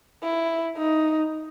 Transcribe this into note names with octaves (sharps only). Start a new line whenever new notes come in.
E4
D#4